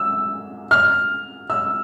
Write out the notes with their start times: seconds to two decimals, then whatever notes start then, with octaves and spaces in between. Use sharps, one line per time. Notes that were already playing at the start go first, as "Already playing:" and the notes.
Already playing: E6
0.71 F6
1.50 E6